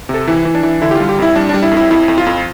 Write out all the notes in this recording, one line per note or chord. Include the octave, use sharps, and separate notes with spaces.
C3 A4
E3 E4
E3
D4
E3
D3 E4
G4
G3 F4
G4
F2 E4
G3 D4
G3 D4
E4
F2
E4
F2 E4
F2
F4
F2